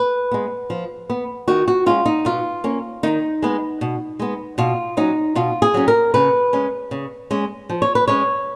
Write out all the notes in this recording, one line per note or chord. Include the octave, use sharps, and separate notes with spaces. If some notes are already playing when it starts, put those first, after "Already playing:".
Already playing: B4
G#3 B3
F3
B3
D#3 F#4
F#4
G#3 C#4 F4
D#4
B2 F4
A#3 C#4
D#3 D#4
G#3 B3
B2
G#3 B3
B2 F4
F#3 C#4 D#4
B2 F4
G#4
F#3 C#4
A#4
C#3 B4
G#3 C#4
C#3
G#3 C#4
F3
C#5
B4
G#3 C#4 C#5